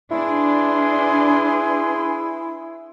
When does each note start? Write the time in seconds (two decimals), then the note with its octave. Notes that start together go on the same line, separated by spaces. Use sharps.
0.11 D4 E4 G#4 B4 C6